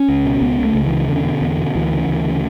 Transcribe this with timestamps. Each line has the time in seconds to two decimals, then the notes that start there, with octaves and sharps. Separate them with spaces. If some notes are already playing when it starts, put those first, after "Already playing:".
Already playing: C#4
0.08 C#2
0.25 B2
0.41 C#2 B3
0.58 C#3
0.64 A3
0.75 C#2
0.86 E3
0.91 C#3
1.08 E2 D3
1.25 B2
1.41 E2
1.58 B2
1.75 D2 E3
1.92 C#3
2.09 D2
2.25 C#3